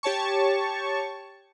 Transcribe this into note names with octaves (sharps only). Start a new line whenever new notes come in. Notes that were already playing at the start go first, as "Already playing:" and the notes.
G4 C#5 A5 C#6